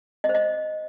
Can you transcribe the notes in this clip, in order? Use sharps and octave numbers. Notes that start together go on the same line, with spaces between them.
D#5
C5
D#5